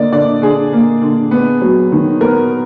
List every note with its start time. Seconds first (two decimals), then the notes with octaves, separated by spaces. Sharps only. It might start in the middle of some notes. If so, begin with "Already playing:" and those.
Already playing: D3 A#3 D5 D#5
0.12 D3 D5
0.42 D3 G#4
0.73 A#3
1.02 D3
1.31 B3
1.61 F#3
1.92 D#3
2.21 B3 A#4